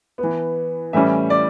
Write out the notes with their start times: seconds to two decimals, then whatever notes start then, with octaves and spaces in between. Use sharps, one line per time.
0.18 B3
0.23 E3
0.93 A2 E3 G3 C#4 E5
1.30 D5